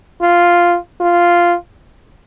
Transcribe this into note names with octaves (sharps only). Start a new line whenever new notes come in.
F4
F4